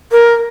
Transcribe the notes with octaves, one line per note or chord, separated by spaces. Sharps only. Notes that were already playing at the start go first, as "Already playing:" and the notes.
A#4